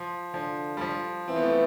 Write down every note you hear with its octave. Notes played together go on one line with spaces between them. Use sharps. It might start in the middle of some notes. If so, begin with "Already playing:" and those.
Already playing: F3
D3 F3
G3
F3
E3 C4
B3
A3
B3